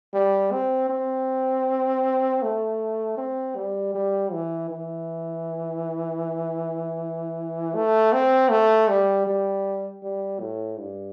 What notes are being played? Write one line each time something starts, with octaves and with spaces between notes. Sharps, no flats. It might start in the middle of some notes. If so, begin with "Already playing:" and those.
G3
C4
C4
A3
C4
G3
G3
E3
E3
A3
C4
A3
G3
G3
G3
A2
G2